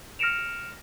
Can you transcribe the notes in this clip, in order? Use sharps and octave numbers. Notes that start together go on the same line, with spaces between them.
F6 A#6 C#7 D7 E7 F7